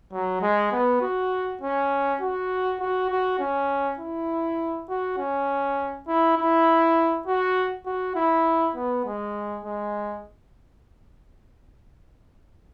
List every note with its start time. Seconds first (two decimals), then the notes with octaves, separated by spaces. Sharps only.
0.13 F#3
0.42 G#3
0.72 B3
1.01 F#4
1.62 C#4
2.22 F#4
2.81 F#4
3.10 F#4
3.40 C#4
3.99 E4
4.89 F#4
5.18 C#4
6.08 E4
6.37 E4
7.27 F#4
7.86 F#4
8.16 E4
8.75 B3
9.05 G#3
9.65 G#3